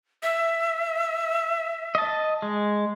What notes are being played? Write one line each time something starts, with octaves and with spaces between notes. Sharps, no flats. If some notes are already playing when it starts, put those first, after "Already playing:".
E5
D#5 A5
G#3